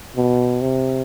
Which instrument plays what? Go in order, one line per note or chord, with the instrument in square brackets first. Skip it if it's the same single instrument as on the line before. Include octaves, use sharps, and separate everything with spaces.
[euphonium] B2
C3